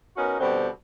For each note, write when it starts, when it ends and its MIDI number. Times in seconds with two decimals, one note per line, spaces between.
0.17 0.35 59
0.17 0.35 61
0.17 0.35 63
0.17 0.35 66
0.17 0.35 70
0.39 0.67 47
0.39 0.67 50
0.39 0.67 55
0.39 0.67 60